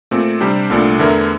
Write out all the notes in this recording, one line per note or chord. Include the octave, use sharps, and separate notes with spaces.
A#2 A3 C4
C3 G3 D4 G4 C5
C2 A#2 A3 D4
E2 D3 A3 E4 A#4